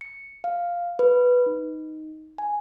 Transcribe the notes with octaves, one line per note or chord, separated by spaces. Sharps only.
C#7
F5
B4
D#4
G#5